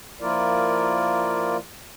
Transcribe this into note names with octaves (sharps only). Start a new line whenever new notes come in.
F3 A#3 E4 F4 A#4 D5